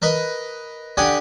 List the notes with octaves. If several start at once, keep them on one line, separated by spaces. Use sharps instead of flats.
A#4 B4 D#5
D3 G4 F#5 G#5 D#6